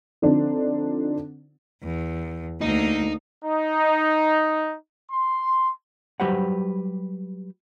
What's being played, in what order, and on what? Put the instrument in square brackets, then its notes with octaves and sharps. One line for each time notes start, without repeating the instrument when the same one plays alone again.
[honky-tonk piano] D3 F3 C4 D4 D#4
[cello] E2
[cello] D2 A#3 [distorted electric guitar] D#4
[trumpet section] D#4
C6
[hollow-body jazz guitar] F#3 G3 G4 B4 C5 F#5